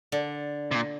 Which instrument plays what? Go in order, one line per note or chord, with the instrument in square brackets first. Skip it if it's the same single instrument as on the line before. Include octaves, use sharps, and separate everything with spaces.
[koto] D3
[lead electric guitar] C3
A#2